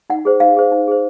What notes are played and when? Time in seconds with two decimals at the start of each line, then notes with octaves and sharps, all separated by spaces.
0.10 D#4 F#5
0.25 G#4 C5
0.40 D#4 F5
0.57 G#4 C5
0.72 D#4
0.88 G#4 C5